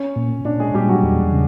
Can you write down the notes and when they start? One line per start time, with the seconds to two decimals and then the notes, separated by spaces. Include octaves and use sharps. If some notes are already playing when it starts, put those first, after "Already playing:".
Already playing: C#4 C#5
0.16 A#2
0.45 A#2 D4 D5
0.59 G#3 G#4
0.74 A#2 G3 G4
0.89 F#3 F#4
1.03 E2
1.32 C#3